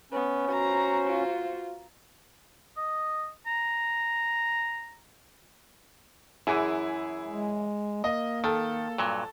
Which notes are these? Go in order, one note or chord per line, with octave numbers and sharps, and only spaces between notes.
B3 C#4
F#4 C5 A#5
F4
D#5
A#5
F#2 E3 E4 G#4
G#3
A#3 D#5
D#3 A4
G2 A#2 F#3